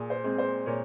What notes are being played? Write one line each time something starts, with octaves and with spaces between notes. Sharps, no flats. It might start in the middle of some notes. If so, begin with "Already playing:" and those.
Already playing: A#2 G#4
C5
G#3 C4
C5
A#2 C#5